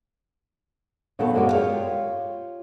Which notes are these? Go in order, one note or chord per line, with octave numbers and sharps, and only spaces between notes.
A#2 D#3 F#3 B3 D#4 A4
F#2 B2 G#3 A#3 F#4 D5
F4 G4 B4 C#5 F5